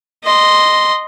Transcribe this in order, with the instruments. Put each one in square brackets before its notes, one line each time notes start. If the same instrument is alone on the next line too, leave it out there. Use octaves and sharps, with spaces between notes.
[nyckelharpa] D#5 C6